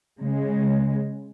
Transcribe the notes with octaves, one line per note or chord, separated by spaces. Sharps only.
C#3 G#3